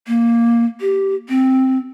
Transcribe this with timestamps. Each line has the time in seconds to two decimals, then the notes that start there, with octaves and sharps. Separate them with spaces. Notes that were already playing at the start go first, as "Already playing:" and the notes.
0.07 A#3
0.81 G4
1.29 C4